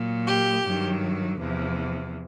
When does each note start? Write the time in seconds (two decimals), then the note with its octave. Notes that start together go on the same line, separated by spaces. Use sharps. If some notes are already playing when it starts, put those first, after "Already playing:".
Already playing: A#2 F#3
0.27 G4
0.64 G2 D#3 F#3
1.38 E2 C3 F3